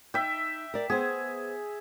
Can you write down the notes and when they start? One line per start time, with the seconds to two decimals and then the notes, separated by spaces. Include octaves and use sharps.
0.14 D#4 E5 G5
0.74 A#4 D5
0.90 B3 G#4 C5